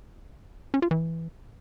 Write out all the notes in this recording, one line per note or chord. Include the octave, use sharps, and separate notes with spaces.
C#4
F4
E3